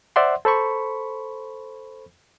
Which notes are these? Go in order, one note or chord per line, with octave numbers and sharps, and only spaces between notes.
C5 D5 E5 F#5 C6
A4 C5 B5 C#6